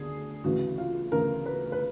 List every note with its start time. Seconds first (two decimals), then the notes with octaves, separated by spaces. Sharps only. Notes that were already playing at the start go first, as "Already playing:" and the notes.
Already playing: D2 D3 G#4
0.44 D2 C#3 E3 F#4
0.78 F4
1.12 D2 C#3 E3 A#4
1.46 B4
1.72 B4